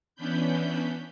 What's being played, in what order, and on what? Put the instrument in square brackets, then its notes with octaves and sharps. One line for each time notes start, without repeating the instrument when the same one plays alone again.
[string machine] E3 B3 C#4 D4 B5 G6